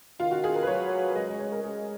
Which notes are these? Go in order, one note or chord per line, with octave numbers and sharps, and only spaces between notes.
D#3 F4
F#4
G#4
A#4
B4
F#3 C#5
G#3 D#5
D#5
C#5
A#4
G#3 G#4